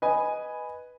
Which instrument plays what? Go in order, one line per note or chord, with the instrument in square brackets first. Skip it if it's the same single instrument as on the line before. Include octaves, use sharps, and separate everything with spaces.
[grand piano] B4 D#5 G#5